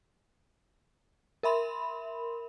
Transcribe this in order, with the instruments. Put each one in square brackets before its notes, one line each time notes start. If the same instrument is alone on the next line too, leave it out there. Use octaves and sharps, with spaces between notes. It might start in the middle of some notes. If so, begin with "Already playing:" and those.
[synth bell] A#4 E5 B5 C6